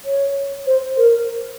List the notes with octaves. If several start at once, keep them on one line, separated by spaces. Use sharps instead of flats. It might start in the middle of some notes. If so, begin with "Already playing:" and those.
C#5
C5
A#4